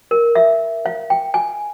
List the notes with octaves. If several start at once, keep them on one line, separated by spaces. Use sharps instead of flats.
A#4
E5
F5
G5
G#5